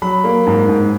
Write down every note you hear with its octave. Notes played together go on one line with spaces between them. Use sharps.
F#3 B5
A#3
G#2
G#2